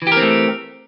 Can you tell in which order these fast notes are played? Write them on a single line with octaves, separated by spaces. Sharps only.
E3 G4 A#4 C4 A3